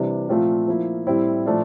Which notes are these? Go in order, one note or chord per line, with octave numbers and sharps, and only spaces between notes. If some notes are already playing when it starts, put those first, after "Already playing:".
Already playing: C3 E3 G3 D4
A#2 F3 A3 C4 F4
F3 A#3 E4
A2 G3 C4 E4
A#2 F3 A3 D4 F4